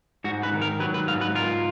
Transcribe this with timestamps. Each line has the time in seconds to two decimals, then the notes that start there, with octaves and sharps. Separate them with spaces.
0.24 G#2 F#4
0.43 B4
0.53 D#3
0.62 A#4
0.80 F#3 B4
0.94 B4
1.07 G#2 F5
1.21 B4
1.35 F4 A#4